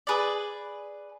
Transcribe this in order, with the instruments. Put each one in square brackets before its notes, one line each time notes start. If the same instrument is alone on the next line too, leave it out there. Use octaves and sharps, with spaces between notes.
[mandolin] G#4 B4 D5